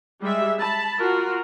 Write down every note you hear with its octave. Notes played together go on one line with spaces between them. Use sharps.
G3 G#3 E5
A5 B5
F4 F#4 A#4